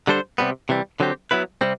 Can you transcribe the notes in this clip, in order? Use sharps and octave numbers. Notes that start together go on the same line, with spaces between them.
D3 G3 D4 A4 C5
C3 G3 B3
C3 E3 G3
D3 F#3 C4 G4
F#3 B3 E4 B4
C3 G3 C4